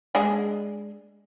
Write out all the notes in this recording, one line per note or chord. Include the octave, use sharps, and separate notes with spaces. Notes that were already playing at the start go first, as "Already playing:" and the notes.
G#3 D4 G#4